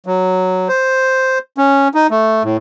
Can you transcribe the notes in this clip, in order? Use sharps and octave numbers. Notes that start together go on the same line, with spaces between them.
F#3
C5
C#4
D#4
A3
A2